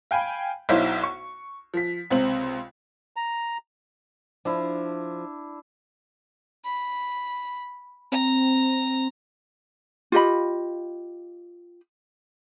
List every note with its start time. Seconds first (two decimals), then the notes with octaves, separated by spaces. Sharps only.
0.11 F5 G5 G#5 B5
0.69 B1 D#4 E4 C5 C#5 F5
1.03 C#6
1.74 F3 B6
2.11 C#2 C3 C4 F#7
3.16 A#5
4.45 F3 D4 E4
6.64 B5
8.12 C4 A#5
10.12 F4 G4 D#5 B5